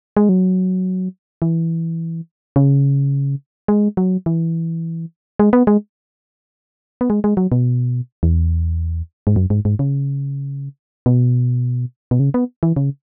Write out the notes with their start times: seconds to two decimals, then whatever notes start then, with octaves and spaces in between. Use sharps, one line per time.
0.17 G#3
0.29 F#3
1.42 E3
2.56 C#3
3.68 G#3
3.97 F#3
4.26 E3
5.39 G#3
5.53 B3
5.67 G#3
7.01 B3
7.10 G#3
7.24 G#3
7.37 F#3
7.52 B2
8.23 E2
9.27 G#2
9.36 F#2
9.50 G#2
9.65 G#2
9.79 C#3
11.06 B2
12.11 B2
12.20 C#3
12.34 B3
12.63 E3
12.76 C#3